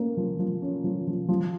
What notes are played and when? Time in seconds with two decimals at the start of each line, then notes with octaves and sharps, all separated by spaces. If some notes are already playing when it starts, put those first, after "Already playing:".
Already playing: A#3 C#4
0.17 F3
0.39 F3
0.62 C#4
0.84 F3
1.07 F3
1.29 F3